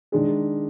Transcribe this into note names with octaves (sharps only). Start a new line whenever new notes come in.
D#3 G#3 D4 G#4